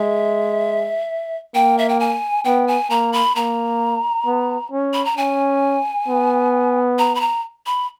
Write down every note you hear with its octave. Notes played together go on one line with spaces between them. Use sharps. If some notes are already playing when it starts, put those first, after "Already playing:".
Already playing: G#3 E5
A#3 G5
E5
G5
G#5
B3 G5
G#5
A#3 A#5
B5
A#3 A#5
B3
C#4
B5
A#5
C#4 G#5
B3
A#5
B5
A#5
B5